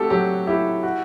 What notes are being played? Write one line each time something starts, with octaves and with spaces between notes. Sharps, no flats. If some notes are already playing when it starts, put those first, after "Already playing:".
Already playing: A3 C4 F#4 G4 A4
F#3 G4
E4 G4
F#4